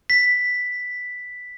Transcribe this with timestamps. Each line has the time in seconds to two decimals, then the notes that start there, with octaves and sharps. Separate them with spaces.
0.10 B6